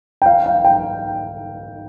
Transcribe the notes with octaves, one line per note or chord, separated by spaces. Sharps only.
G5
F5
F5
G5